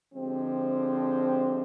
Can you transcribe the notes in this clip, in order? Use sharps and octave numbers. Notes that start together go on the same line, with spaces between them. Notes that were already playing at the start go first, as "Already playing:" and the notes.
D3 F3 G#3 C4 G4